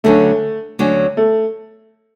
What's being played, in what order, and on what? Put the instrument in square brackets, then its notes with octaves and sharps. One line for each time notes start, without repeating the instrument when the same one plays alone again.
[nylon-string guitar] D2 D3 F#3 C#4 [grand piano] A3
[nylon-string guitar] D2 D3 F#3 C#4
[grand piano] A3